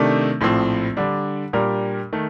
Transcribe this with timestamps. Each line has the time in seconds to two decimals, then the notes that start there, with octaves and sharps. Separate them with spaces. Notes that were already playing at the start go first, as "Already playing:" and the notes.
Already playing: C3 D#3 A3 D4
0.41 A#1 A2 F3 C4
0.97 D3 G3 D4
1.53 A#2 G3 D4 G4 A#4
2.13 D#3 A3